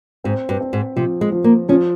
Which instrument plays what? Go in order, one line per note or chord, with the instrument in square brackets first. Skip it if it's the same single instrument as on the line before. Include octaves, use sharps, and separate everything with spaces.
[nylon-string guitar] G#2 [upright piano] C4
[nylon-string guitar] G2
[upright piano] C4
[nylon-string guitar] G#2
[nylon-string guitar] C3 [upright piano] F3
[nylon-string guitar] G#3
[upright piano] F3
[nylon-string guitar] A#3
[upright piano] F3 [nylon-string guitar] C#4